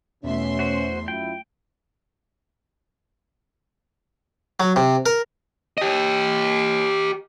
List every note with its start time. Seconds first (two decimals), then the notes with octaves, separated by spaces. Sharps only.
0.24 E2 B2 A3 C#4 E5 C6
0.59 F#4 C5
1.08 F#2 E4 F4 G5
4.60 F#3
4.76 C3
5.06 A#4
5.78 G4 D#5